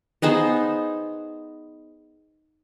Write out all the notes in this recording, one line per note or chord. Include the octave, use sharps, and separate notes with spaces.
B3 D#4 G#4 C5